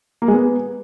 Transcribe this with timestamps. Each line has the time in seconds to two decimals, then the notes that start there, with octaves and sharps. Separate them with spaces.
0.22 A#3
0.28 G#3
0.34 B3